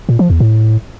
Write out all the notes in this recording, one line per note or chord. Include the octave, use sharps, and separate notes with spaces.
A#2
F3
E2
A2